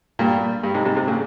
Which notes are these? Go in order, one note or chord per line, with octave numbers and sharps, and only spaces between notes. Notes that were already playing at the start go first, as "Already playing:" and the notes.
G2 A#2
G2
G#2 C3
G#2 C3
G#2 C3
A#2 C#3